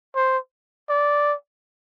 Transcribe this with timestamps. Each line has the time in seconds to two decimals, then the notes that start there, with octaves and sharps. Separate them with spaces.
0.15 C5
0.89 D5